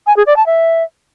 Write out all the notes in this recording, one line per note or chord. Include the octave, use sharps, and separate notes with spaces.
G#5
G#4
D5
A5
E5